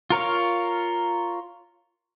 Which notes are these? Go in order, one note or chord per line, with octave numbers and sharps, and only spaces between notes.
F4 A#4 C#5 F5